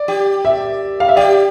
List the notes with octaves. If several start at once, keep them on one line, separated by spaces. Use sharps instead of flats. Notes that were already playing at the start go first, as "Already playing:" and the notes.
Already playing: D5
G4
E5
F5
E5
G4 D5